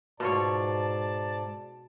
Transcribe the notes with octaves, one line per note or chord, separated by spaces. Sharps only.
G#2 B2 F4 C#5 D5 A5